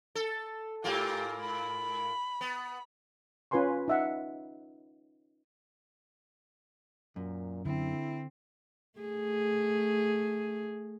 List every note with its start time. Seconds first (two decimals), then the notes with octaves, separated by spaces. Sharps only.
0.15 A4
0.84 G#2 A#3 F4 G4
1.41 B5
2.41 B3
3.51 C#4 F4 B4 G#5 C6 C#6
3.88 D#4 E5 F#5
7.16 F#2 A#2
7.65 D3 C4 E4
8.99 A3 G#4